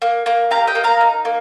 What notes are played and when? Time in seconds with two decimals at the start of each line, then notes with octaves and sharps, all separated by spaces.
0.02 A#3
0.26 A#3
0.51 G4 F5 A#5
0.67 D#5 G5
0.75 A#3
0.84 F5 A#5
1.01 D#4
1.25 A#3